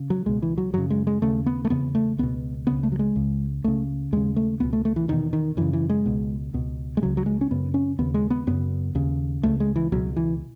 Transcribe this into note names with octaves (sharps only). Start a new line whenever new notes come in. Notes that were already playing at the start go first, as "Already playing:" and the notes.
Already playing: C#3
F#3
C#2 B2 G#3
E3
F#3
F#2 C#3 F#3
G#3
G#3
D#2 C#3 A3
B3
A3
E2 C#3 B3
A3
C#2 B2 B3
C#2 C#3 B3
A3
F#3
G#3
C#2 C#3
C#2 C#3 A3
D#2 C#3 G#3
A3
C#2 B2 B3
A3
A3
E3
E2 B2 D#3
D#3
F#2 C#3 E3
E3
G#3
C#2 B2
C#2 B2
G#3
C#2 C#3 F#3
F#3
G#3
C#4
F#2 C#3 B3
C#4
D#2 C#3 B3
G#3
B3
F#2 C#3 B3
D#2 C#3
C#2 C#3 A3
G#3
E3
C#2 B2 F#3
E3